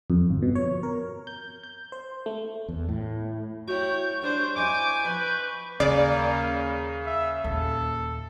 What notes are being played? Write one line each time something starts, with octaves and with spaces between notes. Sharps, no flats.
F2
G1
B2
C#5
A#4
G6
G6
C5
A3
E2
A2
E4 F#4 C#5 G5 C#6 G6
G3 D4 C5
E4 C5 D#5 G#5 D6
F3 B4
D#2 C#3 A#3 D5
E5
D#2 A#2 A4